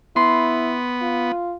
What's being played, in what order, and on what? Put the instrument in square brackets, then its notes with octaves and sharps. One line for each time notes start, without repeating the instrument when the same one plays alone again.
[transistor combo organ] B3 [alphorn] E4 [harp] C6
[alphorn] F4